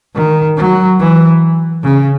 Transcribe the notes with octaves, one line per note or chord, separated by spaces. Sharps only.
D#3
F#3
E3
C#3